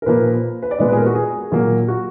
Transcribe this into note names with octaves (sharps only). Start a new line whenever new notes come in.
A#4
A#2 F3 A#3 B4
B4
D5
A#2 G#3 B3 D#5
B4
G#4
A#4
F#4
G#4
A#2 F#3 A#3
F#4